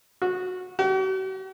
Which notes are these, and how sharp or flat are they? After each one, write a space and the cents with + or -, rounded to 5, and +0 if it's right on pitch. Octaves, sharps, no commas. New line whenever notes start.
F#4 -15
F#4 +45